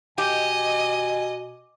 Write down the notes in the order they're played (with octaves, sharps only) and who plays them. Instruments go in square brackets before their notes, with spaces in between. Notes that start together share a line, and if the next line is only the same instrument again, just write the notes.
[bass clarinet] B2 [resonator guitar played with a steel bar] G4 [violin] D#5 [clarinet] G#5